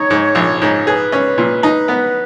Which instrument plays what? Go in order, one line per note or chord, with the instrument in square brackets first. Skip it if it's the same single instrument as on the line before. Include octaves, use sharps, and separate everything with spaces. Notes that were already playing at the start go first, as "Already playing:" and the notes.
Already playing: [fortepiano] D#4 [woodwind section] C#5
[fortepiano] G#2
A#1
G#2
[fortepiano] G#4 [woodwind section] B4
[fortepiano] C#4
A#2
D#4
B3